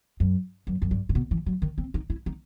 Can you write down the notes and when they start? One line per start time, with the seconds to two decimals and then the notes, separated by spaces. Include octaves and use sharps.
0.20 F#2
0.67 F#2
0.82 F#2
0.91 G2
1.09 A2
1.15 B2
1.31 E3
1.46 F#3
1.62 D#3
1.78 C4
1.94 D#4
2.10 E4
2.26 D#4